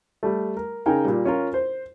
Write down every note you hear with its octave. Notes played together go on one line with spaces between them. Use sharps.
G3 A3
A#4
C#3 D#4 A#4 G5 G#5
A#2 G3
C#4 F4 A#4
C5